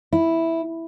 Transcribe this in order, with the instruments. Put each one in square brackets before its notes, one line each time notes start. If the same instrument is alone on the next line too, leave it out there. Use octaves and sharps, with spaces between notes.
[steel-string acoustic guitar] E4